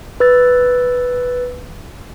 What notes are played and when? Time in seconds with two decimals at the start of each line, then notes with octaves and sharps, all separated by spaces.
0.20 B4 E6 A6